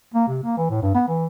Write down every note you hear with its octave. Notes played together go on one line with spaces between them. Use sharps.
A#3
C3
A#3
E3
A2
G2
B3
E3